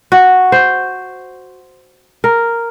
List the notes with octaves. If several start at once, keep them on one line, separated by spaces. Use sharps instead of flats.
F#4
C5
A#4